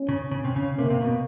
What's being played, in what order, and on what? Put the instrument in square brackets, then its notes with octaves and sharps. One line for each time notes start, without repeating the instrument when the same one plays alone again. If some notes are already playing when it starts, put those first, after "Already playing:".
Already playing: [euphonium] C#4
[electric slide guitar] C#3
C#3
C3
C#3
[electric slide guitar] C3 [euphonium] A#3
[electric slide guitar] C3
B2